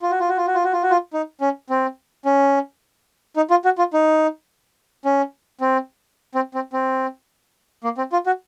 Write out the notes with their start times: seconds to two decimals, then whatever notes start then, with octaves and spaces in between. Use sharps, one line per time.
0.02 F4
0.10 F#4
0.20 F4
0.29 F#4
0.37 F4
0.47 F#4
0.55 F4
0.64 F#4
0.73 F4
0.83 F#4
0.90 F4
1.13 D#4
1.41 C#4
1.70 C4
2.25 C#4
3.36 D#4
3.50 F4
3.65 F#4
3.78 F4
3.93 D#4
5.05 C#4
5.61 C4
6.35 C4
6.54 C4
6.73 C4
7.84 A#3
7.98 C4
8.12 F4
8.26 F#4